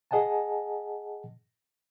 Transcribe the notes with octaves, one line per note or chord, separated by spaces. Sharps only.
G#4 D#5 F#5 G#5 A5